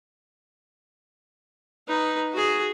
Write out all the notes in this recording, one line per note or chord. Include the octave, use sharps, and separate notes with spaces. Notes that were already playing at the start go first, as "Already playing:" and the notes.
D#4 B4
F#4 G#4